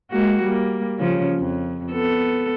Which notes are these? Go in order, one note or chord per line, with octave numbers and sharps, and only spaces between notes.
G#3 A#3 F#4
G3 A#3
C#3 F3 C#4
F2
B3 A4